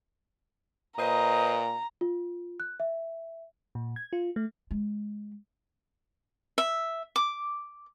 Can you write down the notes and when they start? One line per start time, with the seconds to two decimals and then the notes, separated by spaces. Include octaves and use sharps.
0.98 A#2 B4 C5 D#5 A#5
2.01 F4
2.60 F#6
2.80 E5
3.75 A#2
3.96 G#6
4.13 F4
4.36 A3
4.71 G#3
6.58 E5
7.16 D6